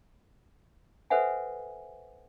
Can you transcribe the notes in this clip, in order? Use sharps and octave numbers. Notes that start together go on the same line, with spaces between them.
A4 B4 C5 E5 F#5 G#5